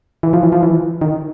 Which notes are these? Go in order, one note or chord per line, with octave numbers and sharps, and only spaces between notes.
E3
F3
E3
F3
E3
D#3